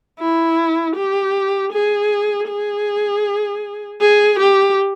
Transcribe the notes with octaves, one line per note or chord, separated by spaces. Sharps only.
E4
G4
G#4
G#4
G#4
G4